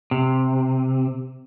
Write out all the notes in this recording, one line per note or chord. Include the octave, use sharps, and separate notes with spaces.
C3